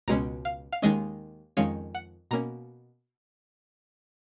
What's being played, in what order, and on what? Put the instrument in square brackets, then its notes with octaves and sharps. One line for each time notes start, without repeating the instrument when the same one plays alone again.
[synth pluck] C#2 B2 G#3 C#4 A#5
F5
F5
D#2 D#3 G#3 C#4 D#5
F2 D#3 G#3 C#4 F5
F#5
B2 A#3 C#4 A#5